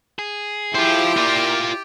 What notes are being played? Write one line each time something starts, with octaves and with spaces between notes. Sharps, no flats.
G#4
E4 F4 G4 C5 G5
A#3 F4 D5